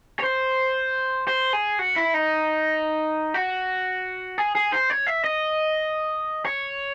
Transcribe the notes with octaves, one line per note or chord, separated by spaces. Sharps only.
C#5
C5
C5
G#4
F#4
E4
D#4
F#4
G#4
G#4
C5
C#5
E5
D#5
C#5